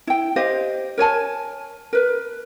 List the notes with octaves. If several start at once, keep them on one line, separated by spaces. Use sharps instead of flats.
E4 G5
G4 C5 D#5 F5
A#4 C#5 G#5 A5
A#4 B4